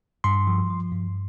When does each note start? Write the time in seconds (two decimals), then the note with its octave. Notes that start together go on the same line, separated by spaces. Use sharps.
0.24 G2 C6
0.47 F3
0.70 F3
0.92 G2